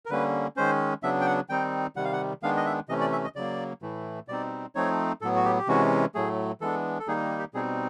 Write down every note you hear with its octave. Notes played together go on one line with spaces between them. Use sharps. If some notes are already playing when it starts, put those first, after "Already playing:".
A#4
D3 G3 A#3 C#4 B4
D#3 G#3 C#4 C5
C#3 F#3 B3 D4 E5
G5
F#5
D#3 G3 C4 D#4 G5
C3 D#3 G3 F#5
F5
F#5
D#3 G#3 B3 D4 F5
D#5
E5
C3 E3 A3 C#4 D#5
D5
E5
D#5
C#3 F#3 A#3 D5
A2 E3 A3
B2 G3 C4 D#4 D5
F3 A3 C4 D#4 C#5
A2 F#3 B3 A4
F#4
G4
G4
C3 E3 G#3 C#4 F#4
A2 F#3 A3 G#4
E3 G#3 B3 D4 A4
A4
D#3 G3 A#3 D#4 G#4
G4
B2 G3 C4 D#4 G#4